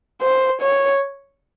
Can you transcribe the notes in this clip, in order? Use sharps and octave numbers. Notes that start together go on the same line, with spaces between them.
C5
C#5